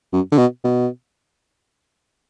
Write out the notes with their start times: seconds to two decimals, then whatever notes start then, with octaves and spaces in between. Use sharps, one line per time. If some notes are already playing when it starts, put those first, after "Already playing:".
0.13 F#2
0.32 D3
0.38 B2
0.64 B2